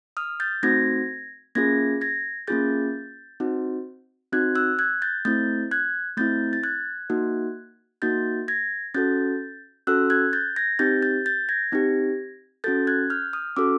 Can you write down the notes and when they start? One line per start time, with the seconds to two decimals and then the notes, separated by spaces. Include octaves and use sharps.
0.17 D#6 F6
0.40 G6 A6
0.63 A3 C4 D#4 F#4 G#6 A#6
1.55 A#3 C#4 F4 G#4 G#6 A#6
2.01 G#6 A#6
2.48 A#3 C#4 F4 G#4 G6 A6
3.40 C4 D#4 F#4
4.33 C4 D#4 F#4 F#6 G#6
4.55 E6 F#6
4.79 F#6 G#6
5.02 G6 A6
5.25 A3 C4 E4 G6 A6
5.71 F#6 G#6
6.17 A3 C4 E4 G6 A6
6.53 A6
6.64 F#6 G#6
7.10 A#3 D#4 F#4
8.02 A#3 D#4 F#4 G6 A6
8.48 G#6 A#6
8.94 C#4 F#4 A4 G6 A6
9.87 C#4 F#4 A4 E6 F#6
10.10 F#6 G#6
10.33 G6 A6
10.56 G#6 A#6
10.79 C4 D#4 G4 G6 A6
11.02 G6 A6
11.26 G6 A6
11.49 G#6 A#6
11.72 C4 D#4 G4
12.64 C#4 F#4 A4 G6 A6
12.87 F#6 G#6
13.10 F6 G6
13.33 D#6 F6
13.56 C#4 F#4 A4 D6 E6